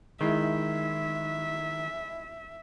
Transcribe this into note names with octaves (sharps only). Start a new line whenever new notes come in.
D#3 G#3 E4 E5